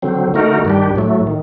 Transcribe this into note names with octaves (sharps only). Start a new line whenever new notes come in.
D3 F#3 C4
D3 A3 D#4 F#4 A#4
G2 D#3 G3 D4 G4
A2 F#3 A3
D#3